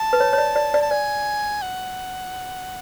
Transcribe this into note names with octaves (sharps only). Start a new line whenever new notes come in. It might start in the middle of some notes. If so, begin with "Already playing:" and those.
Already playing: A5
B4
C#5
C#5
D5
D5
D5
A5
D5 G#5
F#5